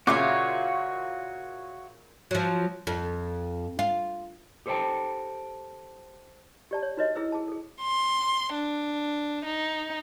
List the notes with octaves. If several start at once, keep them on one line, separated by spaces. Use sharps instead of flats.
A#2 C#3 F4 F#4 C#5 E5 F5 D6
F3 F#3
F2
F4
G4 A4 C5 E5 G5 A5
G4 D5 A5
C#5
D#4 F#4 B4 C#5 D#5
E4 G#4 B4 E6
G#4 A5
G#4 A4
C6
D4
D#4